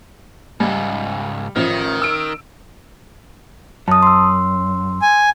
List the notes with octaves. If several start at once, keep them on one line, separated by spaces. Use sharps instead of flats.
C#2 G#2 G3
A1 D#3 F3
E6 D7
F#2 A5 D#6
C6 E6
G#5